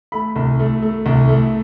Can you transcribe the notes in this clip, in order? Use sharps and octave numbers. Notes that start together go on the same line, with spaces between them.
A3 B5
C2
A3
A3
C2
A3